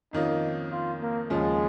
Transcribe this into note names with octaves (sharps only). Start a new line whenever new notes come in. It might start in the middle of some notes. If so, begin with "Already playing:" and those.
F2 D#3 A#3 C#4 D#4 F4
F4
A#3
D#2 C#3 F3 G#3 C#4 F4